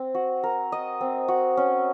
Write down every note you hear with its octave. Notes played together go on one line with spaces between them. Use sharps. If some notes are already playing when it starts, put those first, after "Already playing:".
Already playing: C4
F#4
A#4
D#5
C4
F#4
C#4